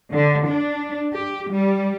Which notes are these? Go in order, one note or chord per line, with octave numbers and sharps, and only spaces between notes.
D3
D4
G4
G3